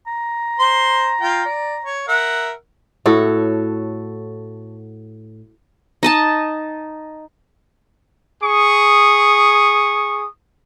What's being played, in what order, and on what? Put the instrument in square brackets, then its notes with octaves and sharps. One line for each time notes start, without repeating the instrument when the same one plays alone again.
[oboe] A#5
[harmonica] C5 C6
F4 G5
D5
C#5
A#4 E5 F#5
[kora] A2 F#4 A4 C#5
[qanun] D#4 D#5 A5
[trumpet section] G#4 C#6 D#6